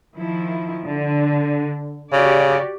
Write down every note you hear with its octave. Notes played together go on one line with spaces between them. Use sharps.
D#3 F3 E4
D3
C#3 F#4 G4 D5